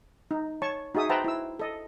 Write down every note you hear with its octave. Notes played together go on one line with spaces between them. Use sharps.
D#4
C#5 A5 C#6
D#4 F#4 G#4 E5 D#6
B4 C5 E5 G5 A5 A#5
E4 E6
A4 D#5